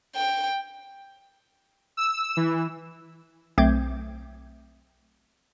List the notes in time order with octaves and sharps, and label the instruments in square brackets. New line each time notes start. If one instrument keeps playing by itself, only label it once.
[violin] G5
[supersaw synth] E6
E3
[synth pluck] B1 A3 C4 D6 G6 G#6